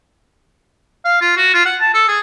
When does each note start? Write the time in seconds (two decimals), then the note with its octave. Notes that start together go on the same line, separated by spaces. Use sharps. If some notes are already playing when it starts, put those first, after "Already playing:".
1.05 F5
1.21 F4
1.37 F#4
1.54 F4
1.65 F#5
1.80 A5
1.94 A4
2.08 G#4